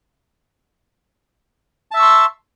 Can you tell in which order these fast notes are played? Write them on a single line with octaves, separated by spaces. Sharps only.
A5 E5 E6 C#6 C6